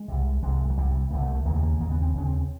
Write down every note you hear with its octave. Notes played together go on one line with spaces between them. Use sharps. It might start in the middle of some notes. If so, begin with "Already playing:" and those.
Already playing: G#3
C2 C3
C2 C3 G#3
F#3
C2 C3 G3
C2 C3 A3
A3
A3
D#2 C#3 A#3
A3
A#3
D#2 C#3 A#3
B3
C4
D#2 C#3 C#4
C4